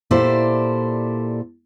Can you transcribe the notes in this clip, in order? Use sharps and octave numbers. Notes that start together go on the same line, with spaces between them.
A#2 E4 G4 A4 C5 D5